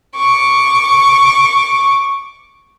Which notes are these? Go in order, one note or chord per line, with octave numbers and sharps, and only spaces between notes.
C#6 D6